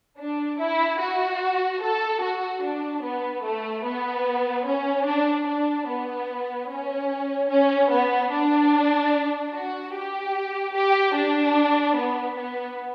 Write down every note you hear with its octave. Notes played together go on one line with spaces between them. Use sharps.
D4
E4
F#4
A4
F#4
D4
B3
A3
B3
C#4
D4
D4
B3
C#4
C#4
B3
D4
F#4
G4
G4
D4
B3
B3